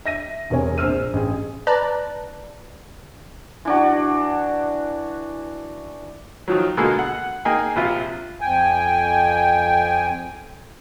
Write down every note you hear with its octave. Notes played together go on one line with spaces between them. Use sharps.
E5 A#6 D#7
E1 C3 A#4 C#5 G#5
A#1 C5 E6 F6 D#7
A1 G#4
B4 D5 A5 A#5 F#6
E3 D4 F#4
D#3 F3 F#3
B2 D3 G#3 A#3 A4
F#5
A#3 D#4 G#4 G5 G#5
A#1 C3 F4 E5
F2 G5 G#5